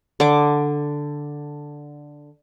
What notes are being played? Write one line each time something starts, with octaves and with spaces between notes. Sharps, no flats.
D3 D6